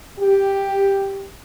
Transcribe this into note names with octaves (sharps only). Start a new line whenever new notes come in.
G4